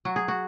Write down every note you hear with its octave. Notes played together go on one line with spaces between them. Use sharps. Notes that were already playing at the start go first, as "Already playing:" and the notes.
F#3 F#4
G#4
F#4